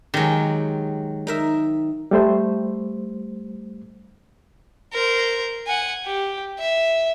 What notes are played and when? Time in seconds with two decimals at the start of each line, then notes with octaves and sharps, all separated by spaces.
0.14 D#3 F#3 G#3 G4
1.27 D#4 A#4 E5
2.11 G3 A3 C5
4.93 A#4 C5
5.67 F#5 G#5
6.06 G4
6.59 E5